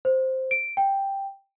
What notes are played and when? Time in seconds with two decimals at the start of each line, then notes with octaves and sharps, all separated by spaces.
0.05 C5
0.51 D7
0.77 G5